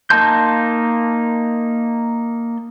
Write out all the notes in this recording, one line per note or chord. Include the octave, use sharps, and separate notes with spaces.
A#3 D#4 A5 C6 G6